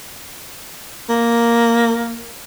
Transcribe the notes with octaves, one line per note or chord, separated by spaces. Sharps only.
A#3